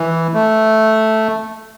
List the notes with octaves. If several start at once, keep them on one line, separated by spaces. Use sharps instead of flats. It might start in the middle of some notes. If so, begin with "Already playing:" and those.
Already playing: E3
A3